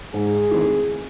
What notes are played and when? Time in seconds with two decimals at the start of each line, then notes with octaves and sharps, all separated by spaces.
0.14 G#2 G#4
0.51 D#3 A3 C4 E4